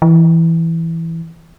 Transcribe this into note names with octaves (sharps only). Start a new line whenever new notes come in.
E3